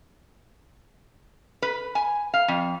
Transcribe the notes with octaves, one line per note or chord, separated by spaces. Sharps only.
B4
G#5
F5
F2